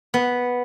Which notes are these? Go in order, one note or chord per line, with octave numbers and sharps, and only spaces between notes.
B3